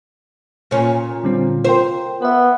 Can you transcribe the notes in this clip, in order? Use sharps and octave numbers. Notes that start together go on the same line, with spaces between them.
A#2 C#4
D3 G3 C4
F4 A#4 C5 G5
B3 B4 E5